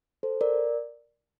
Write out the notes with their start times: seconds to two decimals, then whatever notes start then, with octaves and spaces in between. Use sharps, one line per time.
0.23 A4 C5
0.41 A#4 D5